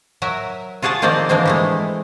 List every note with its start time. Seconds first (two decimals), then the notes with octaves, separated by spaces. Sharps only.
0.22 F#3 A#4 E5
0.82 F4 F#4 G#4 G5 A5
1.02 D#3 F3 A#3 C4 C5 D5
1.29 D3 E3 F3 G#3 A#3 C4
1.45 G#3 A3 E4